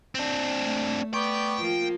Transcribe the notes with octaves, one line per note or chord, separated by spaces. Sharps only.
C4 D4
A3
B3 D5 G5 C#6
F3 A#3 F4